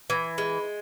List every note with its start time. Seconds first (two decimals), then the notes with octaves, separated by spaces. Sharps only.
0.10 E3
0.38 G#3